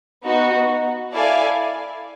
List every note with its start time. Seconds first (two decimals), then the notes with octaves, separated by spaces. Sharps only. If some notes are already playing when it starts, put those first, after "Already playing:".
0.23 B3 D#4 F#4
1.12 E4 A4 D5 F5 G#5